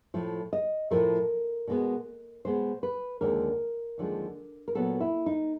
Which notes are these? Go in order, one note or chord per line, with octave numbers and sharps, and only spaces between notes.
A2 F3 A3
D#5
A2 F3 A3 A#4
B2 G#3 B3
B2 G#3 B3 C5
B4
D#2 D3 F3 G#3 A#4
D#2 D3 F3 G#3
A#4
A#2 F#3 B3 A4
E4
D#4